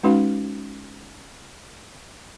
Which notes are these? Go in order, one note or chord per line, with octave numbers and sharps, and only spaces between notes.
G#3 C#4 D#4 F#4 B4 F5